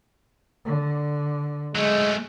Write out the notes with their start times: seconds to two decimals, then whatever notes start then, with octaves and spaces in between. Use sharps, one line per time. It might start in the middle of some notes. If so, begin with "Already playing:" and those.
0.65 D3
1.75 F#3 G#3 A3